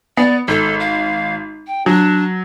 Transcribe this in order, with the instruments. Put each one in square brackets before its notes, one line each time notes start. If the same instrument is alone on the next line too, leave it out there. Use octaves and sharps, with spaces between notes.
[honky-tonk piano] B3 [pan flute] D5
[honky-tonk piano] G#1 [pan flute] A4
[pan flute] F5
G5
[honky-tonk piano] F#3 [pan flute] D4